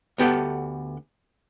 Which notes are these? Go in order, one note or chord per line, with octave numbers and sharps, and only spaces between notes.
D2 B3 G4 A4 F#5